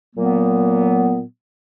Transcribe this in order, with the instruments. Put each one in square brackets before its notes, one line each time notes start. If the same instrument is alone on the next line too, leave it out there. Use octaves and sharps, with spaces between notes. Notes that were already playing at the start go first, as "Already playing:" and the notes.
[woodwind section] A#2 F#3 A#3 B3